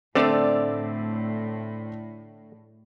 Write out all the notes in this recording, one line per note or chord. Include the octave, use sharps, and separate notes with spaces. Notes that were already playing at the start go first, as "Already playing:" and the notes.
A2 D3 A3 C4 D5 E6